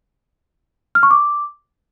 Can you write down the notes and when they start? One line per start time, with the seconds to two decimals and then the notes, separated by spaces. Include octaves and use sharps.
0.95 F6
1.03 C#6
1.11 D6